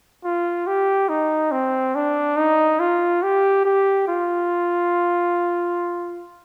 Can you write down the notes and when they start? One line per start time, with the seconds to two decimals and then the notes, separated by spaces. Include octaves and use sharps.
0.25 F4
0.67 G4
1.09 D#4
1.52 C4
1.95 D4
2.37 D#4
2.80 F4
3.23 G4
3.65 G4
4.08 F4